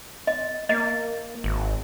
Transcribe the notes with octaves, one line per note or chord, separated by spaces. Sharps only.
D#5
A#3 D#5
G#1